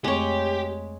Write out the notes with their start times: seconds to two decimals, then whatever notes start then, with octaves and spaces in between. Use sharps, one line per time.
0.04 F2 G#3 A3 C4 G4 C#5